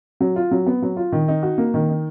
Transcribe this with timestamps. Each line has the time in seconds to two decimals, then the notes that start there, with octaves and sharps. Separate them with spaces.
0.20 F#3
0.36 F4
0.51 F#3
0.66 B3
0.82 F#3
0.97 F4
1.12 D#3
1.28 D#4
1.43 F#4
1.58 A#3
1.74 D#3
1.89 D#4